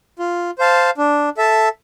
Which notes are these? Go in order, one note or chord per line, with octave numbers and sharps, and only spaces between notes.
F4
C5 F5 A5
D4
A4 E5 A5